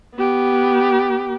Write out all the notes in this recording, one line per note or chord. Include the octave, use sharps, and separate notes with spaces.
B3 G4